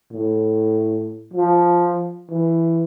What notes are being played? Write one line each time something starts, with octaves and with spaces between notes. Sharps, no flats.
A2
F3
E3